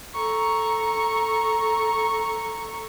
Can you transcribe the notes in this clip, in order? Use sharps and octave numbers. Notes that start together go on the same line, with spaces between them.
A4 A#5 C#6